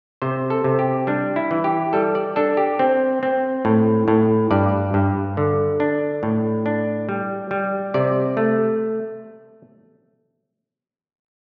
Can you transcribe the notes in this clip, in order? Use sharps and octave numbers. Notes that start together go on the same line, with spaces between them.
C3 C5
A4
C3
G4
G3 D4
E4
E3
G4
G3 A4
D5
D4 A4
G4
C4
C4
A2
A2
G2 D5
G2
D3
D4
A2
D4
G3
G3
C3 D5
A3